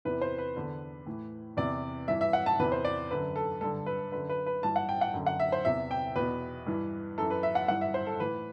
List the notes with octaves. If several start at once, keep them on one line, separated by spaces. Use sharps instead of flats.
E2 C3 E3 B4
C5
B4
E2 D3
A2 E3
E2 C3 E3 D5
G2 E3 E5
E5
F#5
A5
E2 C3 E3 B4
C5
D5
F#2 D3 B4
A4
G2 D3 A4
B4
F#2 D3 B4
B4
B4
G2 E3 A5
F#5
G5
F#5
F#2 D3
F#5
E5
C5
E2 C3 E3 E5
G5
E2 B2 B4
G2 E3
F#2 E3 A4
B4
E5
F#5
G2 E3 F#5
E5
C5
A4
A2 E3 B4